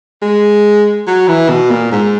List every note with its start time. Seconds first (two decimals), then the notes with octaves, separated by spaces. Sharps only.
0.22 G#3
1.07 F#3
1.28 E3
1.49 B2
1.70 A#2
1.92 G#2